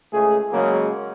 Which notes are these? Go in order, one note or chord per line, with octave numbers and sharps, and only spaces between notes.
C#2 A3 G#4
C#3 F#3 G#3 A#3